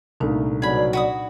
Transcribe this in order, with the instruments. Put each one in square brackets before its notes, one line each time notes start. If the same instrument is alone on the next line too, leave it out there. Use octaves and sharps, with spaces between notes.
[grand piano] C2 A3 A#3 [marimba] A#2 D4 D#4
[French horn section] B2 F#3 D5 [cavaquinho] G#4 B5
[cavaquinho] F#4 B5 D#6